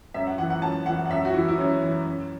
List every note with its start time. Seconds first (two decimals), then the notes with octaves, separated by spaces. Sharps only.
0.14 F#2 E5
0.27 F#5
0.38 E3 F#5
0.50 F#5
0.62 F#2 A5
0.86 E3 F#5
1.06 F#5
1.09 F#2 E5
1.25 F#4
1.33 E3 E4
1.48 E4
1.58 F#2 C#4
1.83 E3
2.06 F#2